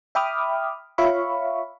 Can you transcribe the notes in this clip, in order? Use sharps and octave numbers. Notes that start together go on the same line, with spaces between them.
E5 G5 B5 D6 D#6 F6
F4 C#5 E5 F5 B5 C#6